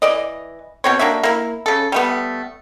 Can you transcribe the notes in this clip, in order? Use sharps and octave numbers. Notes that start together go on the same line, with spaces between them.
E3 D5 D#5
B2 C4 C#5
A#3 D4 F#4 E5
A#3 E4
C#3 A4
G3 A3 B3